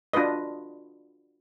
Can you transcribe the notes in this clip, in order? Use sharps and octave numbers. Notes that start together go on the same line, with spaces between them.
D4 F4 F#4 B4 D#5